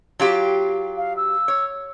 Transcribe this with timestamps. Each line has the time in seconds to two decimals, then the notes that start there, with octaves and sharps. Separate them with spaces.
0.20 F#3 F4 G4
0.97 F5
1.17 E6
1.48 C#5